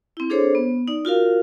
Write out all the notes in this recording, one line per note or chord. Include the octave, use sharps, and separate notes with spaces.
C4 E4
D4 G#4 A4 C5 C#5
B3
D#4 D5
F4 F#4 A#4 F5